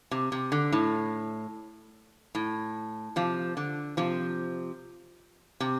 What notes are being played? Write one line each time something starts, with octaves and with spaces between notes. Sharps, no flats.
C3
C3
D3
A2
A2
C3 F3
D3
C3 F3
C3